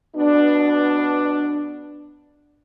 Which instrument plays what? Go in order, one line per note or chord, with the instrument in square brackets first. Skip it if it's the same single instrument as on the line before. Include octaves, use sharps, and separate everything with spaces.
[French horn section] B2 B3 D4